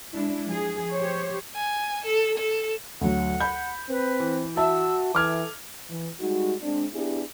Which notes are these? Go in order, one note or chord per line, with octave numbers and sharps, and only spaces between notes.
G#3 D4 E4
F3 G#4
G4 C5 C#5
G#5
A4
A4
D2 F#3 F#5
B5 G6
C4 B4
E3
F#4 E5 A5 E6
E3 A4 D6 F6 G#6
E3
G3 G#3 D#4 F#4
G#3 C4 D4
B3 D4 E4 G4 G#4